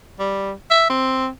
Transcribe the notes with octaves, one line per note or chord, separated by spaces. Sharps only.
G3
E5
C4